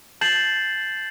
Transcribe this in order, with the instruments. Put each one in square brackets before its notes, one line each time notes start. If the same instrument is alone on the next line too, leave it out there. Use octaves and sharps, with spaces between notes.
[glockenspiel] A5 G6 A6 C7 E7 F#7